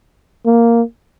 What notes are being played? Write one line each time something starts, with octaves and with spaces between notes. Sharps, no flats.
A#3